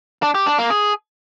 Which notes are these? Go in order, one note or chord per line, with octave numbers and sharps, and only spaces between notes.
D4
G4
D4
A#3
G#4